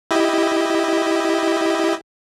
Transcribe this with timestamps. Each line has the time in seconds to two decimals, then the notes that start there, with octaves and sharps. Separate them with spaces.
0.11 E4 G4 D#5